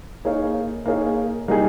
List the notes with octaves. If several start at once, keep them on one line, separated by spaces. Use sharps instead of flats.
A#3 D#4 G#4 C#5 F5
A#3 D#4 G#4 C#5 F5
G3 A#3 D#4 G#4